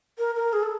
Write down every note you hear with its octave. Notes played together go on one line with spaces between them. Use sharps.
A#4
A#4
G#4
A4